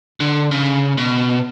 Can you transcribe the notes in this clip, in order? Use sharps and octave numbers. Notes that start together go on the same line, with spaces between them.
D3
C#3
B2